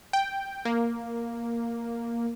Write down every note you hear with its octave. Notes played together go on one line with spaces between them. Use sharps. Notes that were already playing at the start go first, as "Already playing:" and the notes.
G5
A#3